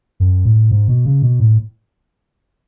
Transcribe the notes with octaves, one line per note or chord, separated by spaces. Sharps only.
F#2
A2
G#2
B2
C#3
B2
A2